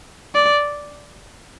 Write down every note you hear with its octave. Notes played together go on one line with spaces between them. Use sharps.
D5